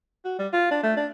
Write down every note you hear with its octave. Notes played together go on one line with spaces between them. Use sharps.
F#4
G3
F4
D4
A3
D4